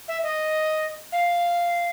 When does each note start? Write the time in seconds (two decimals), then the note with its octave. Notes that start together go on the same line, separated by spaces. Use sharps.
0.08 E5
0.23 D#5
1.12 F5